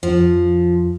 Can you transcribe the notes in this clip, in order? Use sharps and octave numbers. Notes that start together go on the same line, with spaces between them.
F2 F3